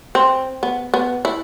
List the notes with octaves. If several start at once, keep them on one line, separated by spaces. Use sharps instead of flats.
C4
B3
B3
E4